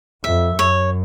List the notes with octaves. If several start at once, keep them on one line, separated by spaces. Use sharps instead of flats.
F2 E5
F#2 C#5